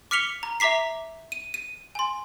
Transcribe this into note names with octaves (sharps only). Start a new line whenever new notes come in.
D6 F6 B6 C#7 F7 G7
A#5
E5 A#5 D6 B6 C7
D#7
D#7
G#5 C6